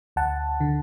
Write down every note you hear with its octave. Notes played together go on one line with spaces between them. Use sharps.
D2 F#5 A5
D3